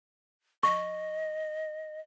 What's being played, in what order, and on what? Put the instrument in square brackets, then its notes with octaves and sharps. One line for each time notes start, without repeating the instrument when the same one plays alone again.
[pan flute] D#5 [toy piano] C#6